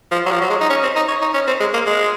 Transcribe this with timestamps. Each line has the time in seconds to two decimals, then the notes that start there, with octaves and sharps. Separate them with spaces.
0.12 F3
0.26 F#3
0.31 F3
0.41 F#3
0.50 G#3
0.60 D#4
0.70 C#4
0.83 C4
0.96 D#4
1.08 C#5
1.22 D#4
1.34 C#4
1.47 C4
1.60 G#3
1.74 A#3
1.86 G#3